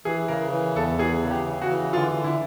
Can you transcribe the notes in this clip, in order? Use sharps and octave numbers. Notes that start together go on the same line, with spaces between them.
E3 G#4
C#3 A#4
E3
E2 A4
E3 G#4
C#3
G4
C#3
F#4
E3
D3 F4
D3
E4